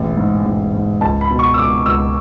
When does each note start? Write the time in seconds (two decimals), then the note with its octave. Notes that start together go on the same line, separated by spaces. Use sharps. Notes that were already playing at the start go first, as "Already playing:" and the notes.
Already playing: E1 A1
0.17 G#2
0.45 A1
0.73 G#2
1.01 C#2 A5
1.21 B5
1.30 B2
1.39 C#6
1.54 E6
1.59 C#2 D6
1.86 C#2 E6